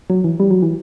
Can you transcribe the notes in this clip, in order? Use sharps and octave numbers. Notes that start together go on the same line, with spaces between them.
F#3
E3
G3
F#3
E3